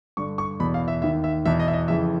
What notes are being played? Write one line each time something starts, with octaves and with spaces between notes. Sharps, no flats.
G2 D3 C#6
C#6
E2 B2 B5
F5
E5
D#2 D#3 E5
E5
E2 B2 E5
D#5
E5
D#5
F2 C#3 E3 E5